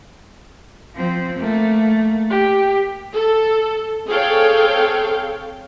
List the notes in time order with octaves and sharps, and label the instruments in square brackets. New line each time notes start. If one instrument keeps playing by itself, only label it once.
[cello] F3 C4
[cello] A3 [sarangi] A#3
[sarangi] G4
[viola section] A4
C4 G#4 A4 C#5 F5 G5